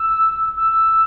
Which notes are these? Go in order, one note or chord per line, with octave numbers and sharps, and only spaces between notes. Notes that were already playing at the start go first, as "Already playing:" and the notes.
Already playing: E6
E6